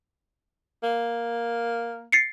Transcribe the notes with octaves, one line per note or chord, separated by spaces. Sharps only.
A#3
A6 C7 C#7